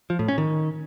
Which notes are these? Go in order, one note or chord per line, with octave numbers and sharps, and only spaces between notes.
F3
A2
C#4
D#3